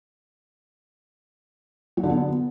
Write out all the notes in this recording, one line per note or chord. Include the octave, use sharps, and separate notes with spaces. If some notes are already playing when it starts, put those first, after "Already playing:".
F#3
D3
B3